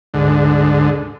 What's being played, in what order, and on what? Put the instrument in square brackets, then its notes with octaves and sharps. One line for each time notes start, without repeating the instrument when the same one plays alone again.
[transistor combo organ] D2 G#2 D3